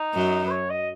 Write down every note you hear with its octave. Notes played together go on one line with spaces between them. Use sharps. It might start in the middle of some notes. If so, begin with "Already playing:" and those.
Already playing: D#4
F#2 F#3
B4
C#5
D#5